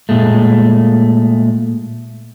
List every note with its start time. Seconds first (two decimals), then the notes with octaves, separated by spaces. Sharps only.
0.09 A#2 G#3 A3